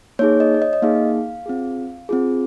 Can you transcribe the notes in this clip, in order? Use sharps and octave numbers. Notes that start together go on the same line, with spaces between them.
A#3 D#4 G#4 C#5
D#5
C#5
D#5
D#5
A#3 D#4 G#4 F5
C4 F4 G#4
C4 F4 G#4